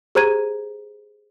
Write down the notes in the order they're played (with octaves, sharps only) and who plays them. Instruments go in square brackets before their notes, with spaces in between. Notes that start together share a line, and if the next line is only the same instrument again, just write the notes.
[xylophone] G4 G#4 C5 A#5 G#6 D#7